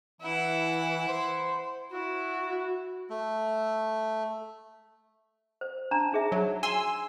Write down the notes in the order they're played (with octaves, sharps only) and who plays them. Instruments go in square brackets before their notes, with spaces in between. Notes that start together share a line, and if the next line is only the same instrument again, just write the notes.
[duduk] E3 [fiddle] E4 F#5
[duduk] C5
[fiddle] E4 [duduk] F#4
[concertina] A3
[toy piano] C5
D4 A5 A#5
D#4 G#4 E5
[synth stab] F#3
G#5 C6 E6